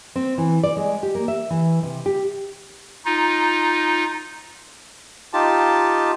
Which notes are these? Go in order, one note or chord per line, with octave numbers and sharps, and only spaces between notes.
C4
E3
D5
G#3
G4
A#3
E5
E3
C3
G4
D#4 F4
D#4 F4 G4 A5